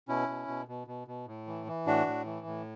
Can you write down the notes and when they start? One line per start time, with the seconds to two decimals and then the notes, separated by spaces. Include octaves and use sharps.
0.08 B2 C#4 E4
0.28 B2
0.48 B2
0.68 B2
0.87 B2
1.08 B2
1.27 A2
1.47 E3
1.67 E3
1.87 A2 D4 F#4
2.06 A2
2.26 E3
2.47 A2